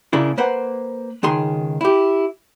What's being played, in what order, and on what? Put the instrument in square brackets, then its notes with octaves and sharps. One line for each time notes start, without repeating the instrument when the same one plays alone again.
[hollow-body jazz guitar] A#2 C#3 A#3 D4 E4
A#3 B4 C5 F#5
C#2 D#3 G#4 C6
E4 G4